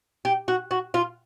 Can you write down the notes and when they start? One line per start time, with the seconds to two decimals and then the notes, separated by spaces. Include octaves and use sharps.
0.25 G4
0.48 F#4
0.71 F#4
0.94 F4